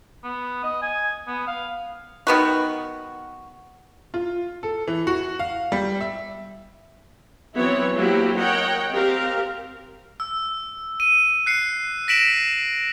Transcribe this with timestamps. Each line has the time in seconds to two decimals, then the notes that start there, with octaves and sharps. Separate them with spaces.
0.24 B3
0.63 D#5
0.82 G#5
1.27 B3
1.47 F5
2.27 D#3 B3 F#4
4.14 F4
4.63 A4
4.87 E3
5.07 F#4
5.39 F5
5.72 G3
6.01 E5
7.55 E3 F#3 B3 C4 E4 C#5
7.95 F#3 A#3 C4 E4 F#4 G4
8.36 A#4 C#5 D#5 F#5 G5
8.92 C4 G4 A#4 F5
10.20 E6
11.00 D#7
11.46 F#6 C7 C#7
12.08 A#6 B6 D7 E7 F#7